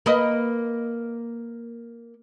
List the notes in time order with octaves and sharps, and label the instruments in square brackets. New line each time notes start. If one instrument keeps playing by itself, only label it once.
[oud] A#3 B4 D#5